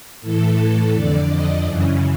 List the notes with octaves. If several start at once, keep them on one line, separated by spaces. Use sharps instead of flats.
A2 E3 A4
F2 D3 D5
D#5
F#2 C#3 E3